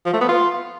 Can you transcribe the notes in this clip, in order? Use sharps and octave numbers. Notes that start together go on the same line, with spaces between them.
F3
A3
B3
F4